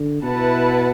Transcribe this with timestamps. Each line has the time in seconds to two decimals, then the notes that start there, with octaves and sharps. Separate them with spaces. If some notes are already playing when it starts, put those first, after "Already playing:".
Already playing: D3
0.23 B2 E4 B4 F#5 A5